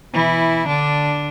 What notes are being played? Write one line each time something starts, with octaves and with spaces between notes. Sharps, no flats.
B2 E3 E4
D3 D4